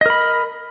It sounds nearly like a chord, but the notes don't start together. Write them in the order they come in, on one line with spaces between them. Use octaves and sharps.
D#5 A#4 B5